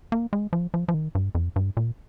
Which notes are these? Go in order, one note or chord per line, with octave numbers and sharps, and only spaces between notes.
A#3
G#3
F3
F3
F3
D#3
G2
F2
G2
A#2